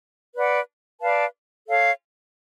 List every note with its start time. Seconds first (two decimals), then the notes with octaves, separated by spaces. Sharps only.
0.35 B4 D5 F#5
1.02 B4 D5 F5 A5
1.67 A4 C#5 F5